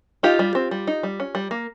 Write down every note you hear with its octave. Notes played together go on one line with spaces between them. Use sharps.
D#4 F4 G4
G3
C4
G3
D#4
G3
C#4
G3
A#3